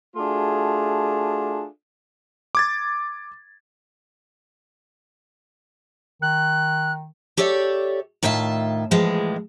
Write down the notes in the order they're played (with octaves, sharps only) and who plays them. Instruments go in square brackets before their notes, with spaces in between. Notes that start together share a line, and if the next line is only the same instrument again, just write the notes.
[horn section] A3 D4 F4 F#4 G#4
[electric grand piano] D6 G#6 A6
[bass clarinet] D#3 [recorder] F#6
[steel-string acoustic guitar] G4 A4 C#5 D5 E5
A2 D#3 F4 E5 G#5 A5
A2 E3 F3 G#3